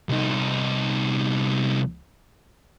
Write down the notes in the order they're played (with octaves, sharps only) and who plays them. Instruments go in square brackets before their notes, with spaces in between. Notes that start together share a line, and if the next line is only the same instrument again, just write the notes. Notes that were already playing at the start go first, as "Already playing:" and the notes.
[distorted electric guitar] C2 D#4